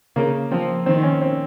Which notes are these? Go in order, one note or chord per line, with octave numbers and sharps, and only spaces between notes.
C#3 A#3
F3 C4
D#3 C4
C#4
C4